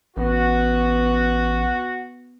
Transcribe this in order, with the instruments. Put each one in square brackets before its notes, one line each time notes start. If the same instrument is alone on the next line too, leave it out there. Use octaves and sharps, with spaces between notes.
[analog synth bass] A1 [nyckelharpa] B3 [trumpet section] F#4